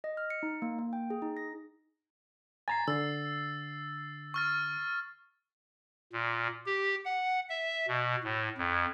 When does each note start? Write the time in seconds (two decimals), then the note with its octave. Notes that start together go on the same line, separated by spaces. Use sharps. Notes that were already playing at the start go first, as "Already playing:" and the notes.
0.04 D#5
0.17 F6
0.30 C#7
0.43 D#4
0.62 A#3
0.79 A#3
0.93 G5
1.10 G#4
1.22 D#4
1.37 A#6
2.68 G#5 A#5 A6 C7
2.88 D3 E6 A6
4.34 C#6 F6 A6
6.13 A#2
6.66 G4
7.05 F#5
7.49 E5
7.88 B2
8.24 A2
8.58 F2